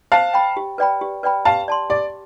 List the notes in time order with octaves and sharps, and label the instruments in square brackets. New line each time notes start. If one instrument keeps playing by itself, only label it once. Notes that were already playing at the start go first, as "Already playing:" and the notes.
[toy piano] C5 [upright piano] F5 A5
[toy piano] G5 B5
G4
B4 D5 G5 B5
G4
B4 D5 G5 B5
[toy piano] G4 [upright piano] F5 A5
[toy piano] D5 A5 C6
[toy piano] G4 [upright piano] D5